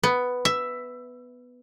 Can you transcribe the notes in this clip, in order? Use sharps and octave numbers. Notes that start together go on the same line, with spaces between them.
B3
E5